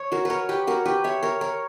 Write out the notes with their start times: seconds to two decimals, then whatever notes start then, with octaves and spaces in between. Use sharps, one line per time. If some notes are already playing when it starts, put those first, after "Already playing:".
Already playing: C#5
0.12 F#4 A#4
0.25 A#4 B4 C#5
0.49 G4 B4
0.67 F#4 A#4
0.85 G4 B4
1.04 C#5 E5
1.23 A#4 C#5
1.41 A#4 C#5